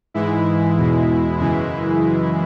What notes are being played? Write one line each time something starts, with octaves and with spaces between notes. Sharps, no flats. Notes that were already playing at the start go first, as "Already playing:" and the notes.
G#2 E3 G#3 E4
E2 B2 G#3
F#2 C#3 E3 G#3 E4